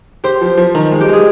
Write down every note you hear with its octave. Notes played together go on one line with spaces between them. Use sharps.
G4 C5
F3
F3
D#3
G#3
G4
G#3 G#4